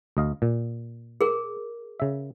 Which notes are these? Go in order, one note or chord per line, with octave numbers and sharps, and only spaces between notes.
D2 D#5 F5
A#2
G#4 A#4
C#3 E5